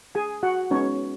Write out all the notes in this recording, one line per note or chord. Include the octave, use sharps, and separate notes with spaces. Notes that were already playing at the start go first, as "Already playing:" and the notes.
G#4 G#5
F#4 F#5
G#3 B3 C#4 D#4 F#4 C#5